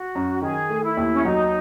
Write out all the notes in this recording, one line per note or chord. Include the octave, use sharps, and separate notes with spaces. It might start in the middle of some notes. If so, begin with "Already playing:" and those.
Already playing: F#4
F#2
D#3 G#4
A3
E4
D#2
C#4
F#3 D#4